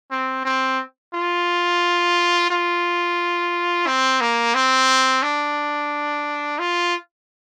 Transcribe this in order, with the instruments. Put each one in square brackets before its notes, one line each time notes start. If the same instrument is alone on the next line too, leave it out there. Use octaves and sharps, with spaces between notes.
[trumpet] C4
C4
F4
F4
C4
A#3
C4
D4
F4